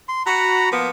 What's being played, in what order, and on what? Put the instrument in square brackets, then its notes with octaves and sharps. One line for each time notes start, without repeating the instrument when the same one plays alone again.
[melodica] C6
[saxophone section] F#4 [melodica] A#5 B5
[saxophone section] F3 A#3 B3